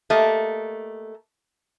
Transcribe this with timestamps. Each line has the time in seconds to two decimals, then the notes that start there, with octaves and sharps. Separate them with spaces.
0.10 A3 A#3 G4 D#5